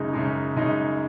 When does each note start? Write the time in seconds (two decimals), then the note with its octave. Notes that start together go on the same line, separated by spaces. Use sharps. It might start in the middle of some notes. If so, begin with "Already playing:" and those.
Already playing: F#2 C#3 G#3 D#4
0.13 F#2 C#3 G#3 D#4
0.56 F#2 C#3 G#3 D#4